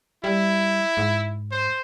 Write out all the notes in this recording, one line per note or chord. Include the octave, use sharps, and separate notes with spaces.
G3 E4
G#2
C5